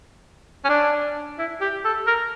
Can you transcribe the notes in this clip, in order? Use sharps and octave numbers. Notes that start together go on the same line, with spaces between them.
C#4
D4
E4
G4
A4
A#4